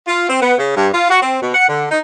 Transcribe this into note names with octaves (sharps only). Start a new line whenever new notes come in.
F4
C4
B3
C#3
G2
F4
F#4
C4
B2
F#5
D3
D#4